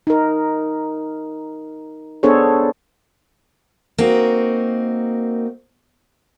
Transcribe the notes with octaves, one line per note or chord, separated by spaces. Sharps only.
D#4 A#4
B3 D4 G#4 A4 C5 C#5
A#3 C4 D#4 F#4